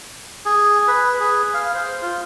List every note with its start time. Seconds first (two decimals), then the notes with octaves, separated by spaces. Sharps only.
0.45 G#4
0.88 B4
1.20 G#4
1.54 F5
1.74 C5
2.02 F4